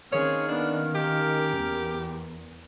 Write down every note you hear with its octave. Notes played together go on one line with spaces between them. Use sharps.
D#3 A#3 C4 C#4 G#4 C#5 F6
B3 D4
G4 A#4
E2